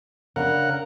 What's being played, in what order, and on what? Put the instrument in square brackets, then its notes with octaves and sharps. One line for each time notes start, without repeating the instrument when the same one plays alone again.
[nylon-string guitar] C#3 D4 [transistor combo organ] A#4 F#5